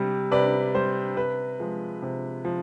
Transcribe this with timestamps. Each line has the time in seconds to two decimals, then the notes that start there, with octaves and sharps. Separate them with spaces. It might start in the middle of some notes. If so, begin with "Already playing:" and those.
Already playing: C3 G3
0.31 C3 B4 D5
0.74 G3 C5
1.16 C3 B4
1.60 F3 G#3
2.02 C3
2.45 F3